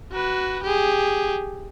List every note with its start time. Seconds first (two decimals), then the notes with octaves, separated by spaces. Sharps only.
0.12 F#4 B4
0.63 G4 G#4